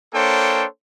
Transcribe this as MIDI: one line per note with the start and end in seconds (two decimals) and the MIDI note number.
0.14 0.64 58
0.14 0.64 62
0.14 0.64 69
0.14 0.64 72
0.14 0.64 73
0.14 0.64 79